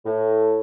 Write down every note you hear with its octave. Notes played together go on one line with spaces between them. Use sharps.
A2